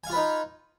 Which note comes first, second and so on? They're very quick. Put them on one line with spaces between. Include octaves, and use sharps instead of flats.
G#5 F5 F4 B4 D#4